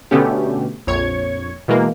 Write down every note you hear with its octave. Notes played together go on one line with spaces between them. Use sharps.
B2 D3 A3 B3 C#4 G4
A#1 F2 C#5 G#6 C#7
B2 E3 G#3 A#3